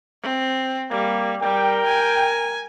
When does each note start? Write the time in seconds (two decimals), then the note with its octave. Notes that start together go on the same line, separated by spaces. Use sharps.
0.23 C4
0.91 G3 A#3
1.42 G3 A#4 G5
1.86 G#5